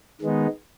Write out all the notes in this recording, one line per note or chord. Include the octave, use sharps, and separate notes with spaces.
D#3 G#3 B3 D#4